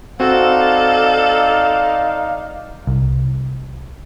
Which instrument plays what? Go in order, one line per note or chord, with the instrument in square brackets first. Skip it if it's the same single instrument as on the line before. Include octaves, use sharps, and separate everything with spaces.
[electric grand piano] C4 F#4 [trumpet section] D#4 D5 F5 [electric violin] A4
[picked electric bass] C2